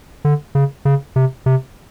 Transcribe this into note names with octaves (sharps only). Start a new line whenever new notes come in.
D3
C#3
C#3
C3
C3